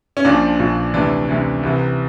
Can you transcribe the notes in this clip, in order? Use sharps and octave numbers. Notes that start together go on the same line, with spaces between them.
C#4
A#1 A#2 F3 D4
A#1 A#2 F3
D2 C3 E3 D4
D2 C3 E3
C2 C3 E3